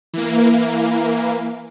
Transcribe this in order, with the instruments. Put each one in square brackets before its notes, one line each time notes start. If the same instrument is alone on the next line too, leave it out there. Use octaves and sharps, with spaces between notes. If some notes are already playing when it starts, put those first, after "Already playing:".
[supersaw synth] E3 A#3